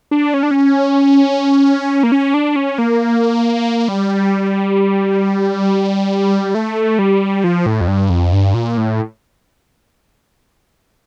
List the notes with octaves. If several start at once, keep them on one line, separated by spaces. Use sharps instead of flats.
D4
C#4
D4
C#4
A#3
C#4
D4
C#4
A#3
G3
A3
G3
F3
A2
F2
G2
F2
G2
A#2
A2